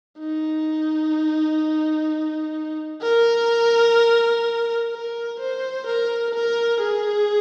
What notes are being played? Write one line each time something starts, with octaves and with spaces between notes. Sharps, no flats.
D#4
A#4
A#4
C5
A#4
A#4
G#4